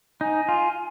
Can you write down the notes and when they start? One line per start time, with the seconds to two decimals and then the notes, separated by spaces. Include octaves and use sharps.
0.21 D#4 G#5
0.48 F4